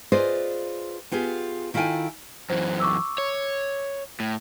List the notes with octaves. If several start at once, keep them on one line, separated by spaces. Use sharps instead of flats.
F4 G#4 B4 C5 D5 D#5
B3 F4 G4 G#4
D#3 E4 F4 A4 G5 G#5
F#2 E3 C5
C#6 D6 E6
C#5
A2